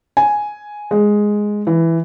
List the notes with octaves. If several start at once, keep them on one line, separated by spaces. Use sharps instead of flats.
G#5
G#3
E3